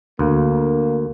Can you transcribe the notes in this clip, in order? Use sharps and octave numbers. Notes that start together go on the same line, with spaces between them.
D2 A#3